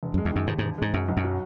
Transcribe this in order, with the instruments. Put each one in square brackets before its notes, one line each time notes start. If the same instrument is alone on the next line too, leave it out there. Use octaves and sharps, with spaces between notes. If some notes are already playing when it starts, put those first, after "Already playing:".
[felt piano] E1
[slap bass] F#2 [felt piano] G#3
[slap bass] E2
[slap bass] F#2 [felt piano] D#3
[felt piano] D#2 [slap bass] G#2
[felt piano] E1 [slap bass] G#2
[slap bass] G#2 [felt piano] G#3
[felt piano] B1 [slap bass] F#2
[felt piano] B1
[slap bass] F#2
[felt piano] F#3